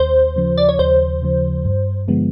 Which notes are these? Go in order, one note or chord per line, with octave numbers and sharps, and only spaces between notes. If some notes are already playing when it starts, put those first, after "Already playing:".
Already playing: D#2 C5
C#3 F3
D5
C#5
D#2 C5
C#3 F3
G2
D3 F3 G#3 B3